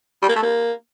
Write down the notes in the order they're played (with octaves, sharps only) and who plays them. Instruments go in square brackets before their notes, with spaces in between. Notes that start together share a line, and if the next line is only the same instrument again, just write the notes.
[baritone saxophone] G3
A#3
A3
A#3